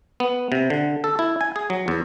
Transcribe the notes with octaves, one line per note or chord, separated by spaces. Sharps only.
B3
C3
D3
A4
E4
G#5
G#4
F#3
E2